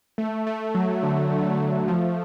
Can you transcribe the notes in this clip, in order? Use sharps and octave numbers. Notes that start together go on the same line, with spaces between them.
A3
A3
F#3
D3
D3
A3
F3